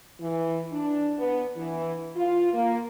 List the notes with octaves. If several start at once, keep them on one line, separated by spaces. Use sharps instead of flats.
E3
D4
B3
E3
F4
A#3